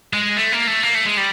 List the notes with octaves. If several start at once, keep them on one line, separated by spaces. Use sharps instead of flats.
G#3
A3
A#3
A3
A#3
A3
G#3
G3